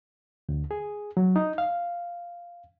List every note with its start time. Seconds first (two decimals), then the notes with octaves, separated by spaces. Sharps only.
0.49 D2
0.71 G#4
1.17 F#3
1.36 D#4
1.58 F5